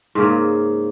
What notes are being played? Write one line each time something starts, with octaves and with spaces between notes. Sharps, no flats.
G#2 C#3 A#3